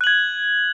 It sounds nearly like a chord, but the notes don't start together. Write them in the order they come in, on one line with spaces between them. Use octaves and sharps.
F#6 F#7 G#6